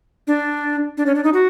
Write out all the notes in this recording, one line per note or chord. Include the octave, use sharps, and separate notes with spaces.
D4
D4
C#4
D4
D#4
F#4